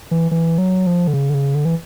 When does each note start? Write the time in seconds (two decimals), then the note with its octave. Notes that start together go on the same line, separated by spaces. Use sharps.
0.11 E3
0.31 E3
0.58 F#3
0.87 F3
1.07 D3
1.13 C#3
1.30 D3
1.34 C#3
1.55 D3
1.65 E3